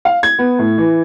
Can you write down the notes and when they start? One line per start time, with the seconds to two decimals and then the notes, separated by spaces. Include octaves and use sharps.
0.05 F5
0.23 G#6
0.38 B3
0.59 A2
0.78 E3